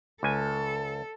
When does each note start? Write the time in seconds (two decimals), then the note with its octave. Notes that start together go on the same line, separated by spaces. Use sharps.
0.23 C#2 A4 G#5